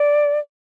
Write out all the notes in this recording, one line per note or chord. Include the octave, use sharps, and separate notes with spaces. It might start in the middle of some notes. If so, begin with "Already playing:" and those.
Already playing: D5